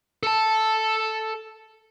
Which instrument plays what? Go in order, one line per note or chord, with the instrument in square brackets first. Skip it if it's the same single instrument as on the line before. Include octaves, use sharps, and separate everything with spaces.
[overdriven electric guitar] A4 A5